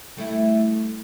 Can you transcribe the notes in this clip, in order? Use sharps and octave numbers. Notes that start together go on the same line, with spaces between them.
G3 A3 E4